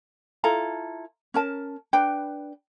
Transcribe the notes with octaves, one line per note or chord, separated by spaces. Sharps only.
E4 F4 A4 A#5
C#4 A#4 A5
D4 B4 G5